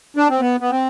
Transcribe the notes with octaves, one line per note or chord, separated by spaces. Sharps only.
D4
C4
B3
B3
C4